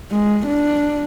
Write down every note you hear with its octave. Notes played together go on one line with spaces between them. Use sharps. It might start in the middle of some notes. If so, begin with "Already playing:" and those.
G#3
D4